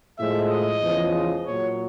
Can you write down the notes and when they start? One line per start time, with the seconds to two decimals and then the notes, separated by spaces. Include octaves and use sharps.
0.19 A2 F3 G#3 E5
0.51 D#5
0.82 E2 C#3 F3 G#3
1.45 A#2 F#3 C#5